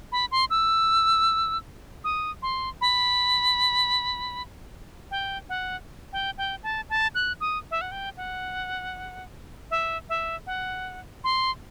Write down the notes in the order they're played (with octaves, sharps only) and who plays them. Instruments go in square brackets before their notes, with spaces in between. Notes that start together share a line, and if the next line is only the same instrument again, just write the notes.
[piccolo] B5
C6
E6
D#6
C6
B5
G5
F#5
G5
G5
A5
A5
F#6
D#6
E5
F#5
G5
F#5
E5
E5
F#5
C6